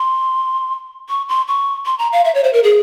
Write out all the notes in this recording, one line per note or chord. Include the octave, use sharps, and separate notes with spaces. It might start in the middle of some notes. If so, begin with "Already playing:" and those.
Already playing: C6
C#6
C6
C#6
C6
A#5
F5
E5
C#5
C5
A#4
G#4